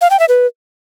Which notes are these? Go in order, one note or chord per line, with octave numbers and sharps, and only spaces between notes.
F5
G5
E5
B4